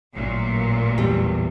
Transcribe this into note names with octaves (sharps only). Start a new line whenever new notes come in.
A1 A#2 F#3
E2 G3